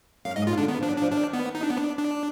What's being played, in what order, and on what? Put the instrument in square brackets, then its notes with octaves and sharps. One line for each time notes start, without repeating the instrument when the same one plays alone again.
[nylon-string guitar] F#2 [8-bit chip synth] F5
[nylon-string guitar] G#2 [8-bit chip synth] D#5
[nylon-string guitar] A#2 [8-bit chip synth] F4
[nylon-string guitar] D3 [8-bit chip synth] D4
[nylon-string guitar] D#3 [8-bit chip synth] B3
[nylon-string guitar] F3 [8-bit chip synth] D4
[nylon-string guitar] F#3
[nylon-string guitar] F3 [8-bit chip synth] D4
[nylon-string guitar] D#3 [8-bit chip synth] D4
[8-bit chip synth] B3
D#4
D4
B3
D4
D4